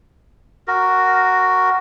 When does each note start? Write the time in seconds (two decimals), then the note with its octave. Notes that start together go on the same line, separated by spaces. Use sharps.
0.68 F#4 A#4